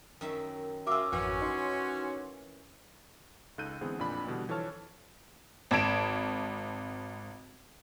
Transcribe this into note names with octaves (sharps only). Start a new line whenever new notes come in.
F#2 D#3 E5
C#4 F4 F#4 A#4 E5 D6 E6
G#1 F2 E3 C#4 F#4
D#4 C#5 C6
C#2 D#4 A4 F#6 G6 D#7
D3 E3 G#3 B3 C4 G#4
A1 F2 A#2 D4 B5
B2 D3 E3 G3 B3 D4
E3 F3 A4 C#5 A5 F6
G#1 A5 G#6 D7 E7